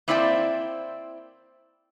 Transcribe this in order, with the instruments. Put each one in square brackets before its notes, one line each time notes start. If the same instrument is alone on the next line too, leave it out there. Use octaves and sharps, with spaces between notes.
[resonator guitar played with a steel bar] A#3 C4 E4 C5 D5 G5